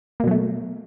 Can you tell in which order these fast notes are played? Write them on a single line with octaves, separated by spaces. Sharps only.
A#3 B2 F#3 A3